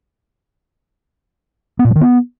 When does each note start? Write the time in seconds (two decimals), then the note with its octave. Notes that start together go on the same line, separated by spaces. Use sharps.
1.79 B3
1.85 A#2
1.90 F#3
1.96 D#3
2.01 B3